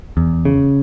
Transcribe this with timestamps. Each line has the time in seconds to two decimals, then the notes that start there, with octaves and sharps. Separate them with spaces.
0.17 E2
0.45 C#3